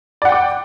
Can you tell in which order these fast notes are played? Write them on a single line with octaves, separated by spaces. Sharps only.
D5 F#5 G5 D6